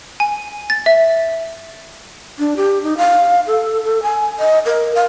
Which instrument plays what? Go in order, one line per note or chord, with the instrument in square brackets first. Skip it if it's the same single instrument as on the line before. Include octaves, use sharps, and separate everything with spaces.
[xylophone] G#5
A6
E5
[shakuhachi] D4
G4
D#4
F5
A4
A4
G#5
D#5
A#4
F5